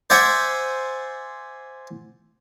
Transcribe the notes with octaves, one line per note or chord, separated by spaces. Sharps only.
C5 D5 E5 F#5 G#5